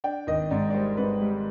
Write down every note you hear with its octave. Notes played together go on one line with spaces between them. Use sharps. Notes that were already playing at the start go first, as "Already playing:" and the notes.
D4 G5
G#1 D#5
G#2 D5
D5
G3 C5
G#2 B4
G3